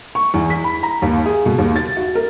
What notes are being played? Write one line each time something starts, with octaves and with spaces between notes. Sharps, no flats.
C#6
E2
B6
B5
A#5
D#2
G#4
B2
D#2
A6
F#4
A#4